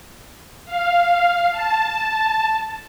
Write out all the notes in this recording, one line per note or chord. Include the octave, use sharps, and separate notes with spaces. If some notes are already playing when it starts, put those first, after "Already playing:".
F5
A5